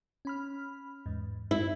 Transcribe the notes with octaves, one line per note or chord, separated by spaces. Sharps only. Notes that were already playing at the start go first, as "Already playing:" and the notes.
C#4 B5 F6
E2 G#2
G2 E4